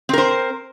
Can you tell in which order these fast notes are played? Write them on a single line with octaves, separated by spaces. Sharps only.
C4 A#4 C5